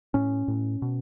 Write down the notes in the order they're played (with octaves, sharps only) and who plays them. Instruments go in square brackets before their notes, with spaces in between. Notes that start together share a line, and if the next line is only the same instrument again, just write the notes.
[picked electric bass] A2 C#4
A2
B2